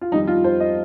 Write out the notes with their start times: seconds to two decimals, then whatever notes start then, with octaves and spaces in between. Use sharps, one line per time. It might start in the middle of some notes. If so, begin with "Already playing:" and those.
0.01 F4
0.12 F2 D#3 G3 D#4
0.27 F4
0.44 C5
0.60 D#5